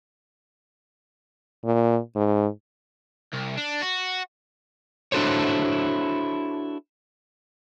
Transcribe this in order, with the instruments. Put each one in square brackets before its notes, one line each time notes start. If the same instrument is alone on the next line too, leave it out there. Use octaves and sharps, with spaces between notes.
[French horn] A#2
G#2
[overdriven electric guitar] C2
D4
F#4
[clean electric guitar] D4 E4 F#4 A4 C5 C#5